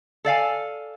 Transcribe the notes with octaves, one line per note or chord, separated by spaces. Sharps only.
A4 D5 F5 G#5